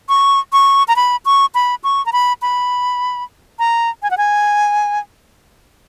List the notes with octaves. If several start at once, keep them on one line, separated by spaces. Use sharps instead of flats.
C#6
C#6
A#5
B5
C#6
B5
C#6
A#5
B5
B5
A#5
G#5
F#5
G#5